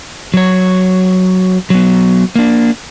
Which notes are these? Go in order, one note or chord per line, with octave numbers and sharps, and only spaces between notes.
F#3 C#5
F#3 B3
A#3 D4